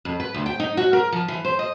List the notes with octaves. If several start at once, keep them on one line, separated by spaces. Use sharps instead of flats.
F2
B4
D2
G5
D#4
F#4
A#4
F3
E3
C5
D#5